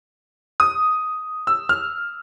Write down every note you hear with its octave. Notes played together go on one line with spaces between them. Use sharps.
D#6
E6
F6